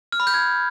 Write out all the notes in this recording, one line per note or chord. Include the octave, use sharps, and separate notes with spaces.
F6
B5
G6
G#6